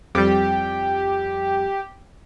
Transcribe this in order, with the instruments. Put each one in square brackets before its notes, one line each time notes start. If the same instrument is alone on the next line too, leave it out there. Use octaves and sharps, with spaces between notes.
[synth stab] F2 G3 [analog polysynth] G4